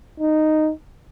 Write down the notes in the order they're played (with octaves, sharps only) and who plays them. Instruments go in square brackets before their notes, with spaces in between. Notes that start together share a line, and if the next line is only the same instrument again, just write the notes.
[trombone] D#4